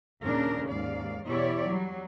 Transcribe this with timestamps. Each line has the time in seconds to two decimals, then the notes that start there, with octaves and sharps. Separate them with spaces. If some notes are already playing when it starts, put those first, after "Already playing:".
0.21 D#2 A#2 C#3 D4 A#4
0.69 D#2 G#2 D5 F5
1.27 E2 B2 E4 G4 C#5 D5
1.67 F#3 G3